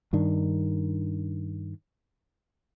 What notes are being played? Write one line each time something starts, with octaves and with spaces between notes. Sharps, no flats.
G2 D#3 D4